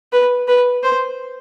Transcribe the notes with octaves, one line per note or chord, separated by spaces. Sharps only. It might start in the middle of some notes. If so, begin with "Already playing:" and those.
B4
B4
C5